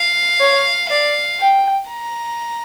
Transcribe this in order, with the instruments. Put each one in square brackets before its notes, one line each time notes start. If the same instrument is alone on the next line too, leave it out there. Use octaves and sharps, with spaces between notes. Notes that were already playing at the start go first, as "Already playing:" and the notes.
Already playing: [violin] F5
[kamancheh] C#5
[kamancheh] D5 [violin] F5
[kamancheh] G5
[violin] A#5